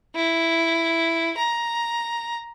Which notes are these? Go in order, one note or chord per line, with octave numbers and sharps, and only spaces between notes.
E4
A#5